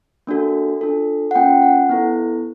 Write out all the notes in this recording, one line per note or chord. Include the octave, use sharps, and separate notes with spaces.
A#3 D4 F#4 A4
D4 F4 A4
F#5
A#3 C#4 F4 G5
F#5
B3 E4 A4